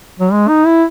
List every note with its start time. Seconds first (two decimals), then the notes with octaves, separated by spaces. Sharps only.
0.20 F#3
0.32 G#3
0.48 D#4
0.66 E4